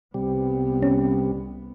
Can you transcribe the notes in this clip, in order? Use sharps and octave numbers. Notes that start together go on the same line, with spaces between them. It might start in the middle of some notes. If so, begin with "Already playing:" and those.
C2 C3 G3 B3
C#4